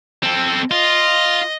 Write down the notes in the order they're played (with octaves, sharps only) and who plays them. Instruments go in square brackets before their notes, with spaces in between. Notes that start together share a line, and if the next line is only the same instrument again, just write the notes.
[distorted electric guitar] C4 A4
[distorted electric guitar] F4 [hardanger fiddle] D#5